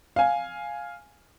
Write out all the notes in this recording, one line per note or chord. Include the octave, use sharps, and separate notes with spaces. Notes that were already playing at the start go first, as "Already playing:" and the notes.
F5 G#5